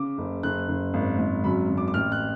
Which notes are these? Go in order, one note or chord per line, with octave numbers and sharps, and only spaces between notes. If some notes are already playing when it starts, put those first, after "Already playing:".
Already playing: C#3 D6
F#1
F#1 F#6
F#1
G#1
G#1
F#2 B5
F#2
D6
D6
A1 F6
F#6